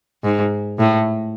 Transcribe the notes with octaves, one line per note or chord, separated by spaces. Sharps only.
G#2
A2